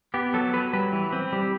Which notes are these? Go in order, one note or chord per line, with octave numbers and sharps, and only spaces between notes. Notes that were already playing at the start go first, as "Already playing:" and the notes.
B3 G4
F#3 A4
F#3 B4
G3 B4
E3
C4
G3